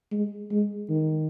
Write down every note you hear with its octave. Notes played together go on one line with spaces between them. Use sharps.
G#3
G#3
D#3